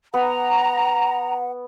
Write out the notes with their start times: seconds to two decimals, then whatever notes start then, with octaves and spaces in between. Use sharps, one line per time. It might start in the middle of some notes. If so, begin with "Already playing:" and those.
0.14 B3 F#5 A#5